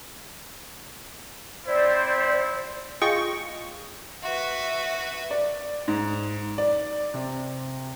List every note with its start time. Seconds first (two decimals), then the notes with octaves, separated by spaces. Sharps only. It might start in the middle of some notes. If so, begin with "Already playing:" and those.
1.66 C4 E4 C5 D5
3.02 F4 G#4 D#5 G5 C#6
4.23 F#4 B4 E5
5.31 D5
5.88 G#2
6.58 D5
7.14 C3